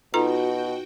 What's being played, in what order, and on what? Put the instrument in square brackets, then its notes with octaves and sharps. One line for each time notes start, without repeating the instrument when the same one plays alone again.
[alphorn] B2 [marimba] D#4 B4 [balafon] F4 A4 A#5 [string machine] F#4 G5